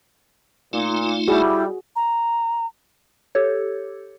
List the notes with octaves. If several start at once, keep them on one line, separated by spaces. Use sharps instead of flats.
A#2 A3 D#4 F4
G3 E4 F#4 G#4
A#5
G4 A4 C#5